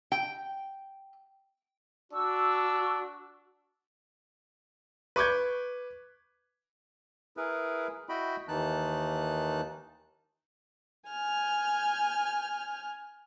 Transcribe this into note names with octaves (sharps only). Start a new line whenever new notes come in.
G5
D4 F#4 C#6 E6
B4 C#6 D6 G6 G#6
E4 G#4 A#4 B4
E4 F#4 D#5 G5 B5
D#2 D#3 E3 D#4 A5 F#6
G#5 F6 G6